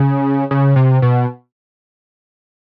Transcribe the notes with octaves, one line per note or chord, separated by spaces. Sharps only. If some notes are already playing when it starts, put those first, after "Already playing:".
Already playing: C#3
C#3
C3
B2